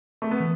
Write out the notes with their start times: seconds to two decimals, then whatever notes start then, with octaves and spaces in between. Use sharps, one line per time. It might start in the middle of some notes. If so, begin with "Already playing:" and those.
0.22 A3
0.31 B3
0.40 E3